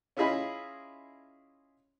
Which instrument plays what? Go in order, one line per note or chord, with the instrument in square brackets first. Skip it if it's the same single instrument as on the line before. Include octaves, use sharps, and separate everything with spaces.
[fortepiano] C#4 E4 F4 G#4 D#5 B5